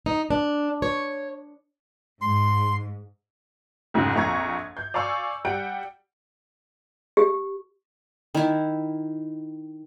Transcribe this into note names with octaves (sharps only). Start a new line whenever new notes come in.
D#4
D4
C#5
G#2 C6
C2 F2 G#2 C#3
A#1 F2 A#5 C#6 G#6
G6
D5 F5 G#5 C#6 E6
G3 F#5 G5 D7
G4
D#3 E4